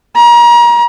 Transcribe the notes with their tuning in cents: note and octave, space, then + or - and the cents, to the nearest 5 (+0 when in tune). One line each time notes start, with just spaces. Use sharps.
A#5 +35